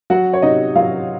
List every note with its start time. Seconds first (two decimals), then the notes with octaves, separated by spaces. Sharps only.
0.10 F#3 F#4 F#5
0.33 C#5
0.42 C3 D#4 D#5
0.75 F#3 F4 F5